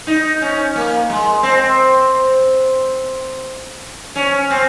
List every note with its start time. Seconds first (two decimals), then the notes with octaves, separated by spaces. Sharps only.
0.07 D#4
0.41 C#4
0.76 A#3
1.10 G#3
1.43 C4
4.16 C#4
4.50 C4